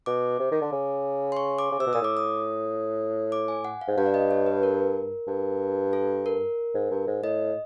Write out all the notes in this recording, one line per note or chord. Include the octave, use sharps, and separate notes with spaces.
B2 D6
C3
D#3
D3
C#3
C6
C#6
D6
C#3
C3 E6
B2
A#2 D#6
A2 D6
D#6
D6
G#5
F#5
F5
G#2
G2 F5
D5
D#5
C#5
B4
A#4
G2
A4
A#4
G#2
G2
G#2
A2 D#5